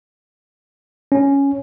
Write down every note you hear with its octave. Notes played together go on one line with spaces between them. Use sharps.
C#4